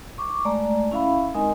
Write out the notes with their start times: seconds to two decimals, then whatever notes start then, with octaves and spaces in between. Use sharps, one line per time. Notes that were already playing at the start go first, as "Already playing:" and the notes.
0.18 C#6 D6
0.45 G#3 A3 D5 A#5
0.92 C#4 E4 E5 F5 B5
1.34 G#3 C4 D#4 A#4 D#5 G#5